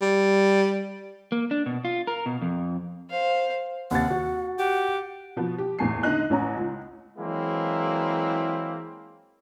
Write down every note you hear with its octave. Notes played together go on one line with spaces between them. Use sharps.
G3
A#3
D4
B2
F4
A#4
B2
F2
C5 F5
D#2 C3 F#5 A6
F#4
G4 F#5
B2 F3 B3
G4
F#1 E2 A2 G#5 C7
D3 B3 D#4 D#5 F#6
A1 C#4 A#5
C#2
E3 F#3 G#3 A#3 C4 E4